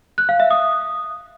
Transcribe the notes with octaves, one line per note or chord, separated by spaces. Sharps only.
F#6
F5
E5
D#6